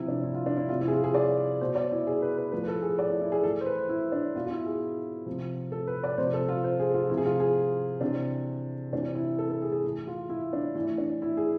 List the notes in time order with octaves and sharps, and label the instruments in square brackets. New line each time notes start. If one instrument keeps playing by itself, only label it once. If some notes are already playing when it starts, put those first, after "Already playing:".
Already playing: [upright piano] C3 F3 E4
D4
E4
F4
D4
E4
C3 F3 F4
E4
G#4
F4
G#4
D5
B2 C5
D5
E4
G#4
B4
B4
A2 F3 B4
B4
A4
G#4
D5
E4
E4
G#4
E3 A4
A2
C5
B4
E4
D4
B2 F4
F4
E4
G#4
C3 F3
A4
B4
D5
C3 F3 C5
A4
F4
C5
G#4
F4
C3 F3 E4
G#4
F4
G#4
C3 E3 D4
C3 E3 D4
E4
A4
A4
G#4
G#4
A2 E3
F4
E4
D4
A2 E3 E4
D4
E4
G#4